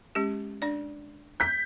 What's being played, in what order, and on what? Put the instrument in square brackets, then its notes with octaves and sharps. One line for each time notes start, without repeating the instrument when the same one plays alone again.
[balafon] G#3 C#4 G4
D4 D5
[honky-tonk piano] G6 B6